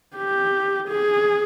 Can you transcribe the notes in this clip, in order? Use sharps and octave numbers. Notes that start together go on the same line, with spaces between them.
G4
G#4